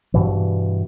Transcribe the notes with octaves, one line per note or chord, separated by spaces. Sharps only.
G2 B2 E3